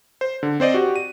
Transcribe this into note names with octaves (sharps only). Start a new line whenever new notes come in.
C5
D3
C4 C5 D5 D#5
F#4 G4
D#7